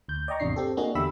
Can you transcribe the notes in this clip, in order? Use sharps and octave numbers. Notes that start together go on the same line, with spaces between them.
D2 G6
D5 D#5 G5 A#5 C#6
G#1 E2 C3 D4 C7
C4 G4 A4
A#3 D4 F#4 G#4 D#5
E2 D3 G4 E5 B5 E6